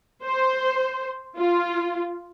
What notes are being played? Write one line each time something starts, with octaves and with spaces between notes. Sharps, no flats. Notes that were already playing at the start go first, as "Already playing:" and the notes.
C5
F4